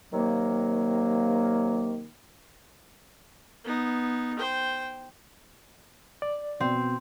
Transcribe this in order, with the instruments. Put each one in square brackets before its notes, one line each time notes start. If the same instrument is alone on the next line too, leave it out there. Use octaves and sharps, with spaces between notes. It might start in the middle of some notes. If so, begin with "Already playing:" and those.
[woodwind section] C3 D#3 F#3 A#3
[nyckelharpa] B3 D#4
C5 G5
[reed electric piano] D5
[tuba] B2 [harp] C4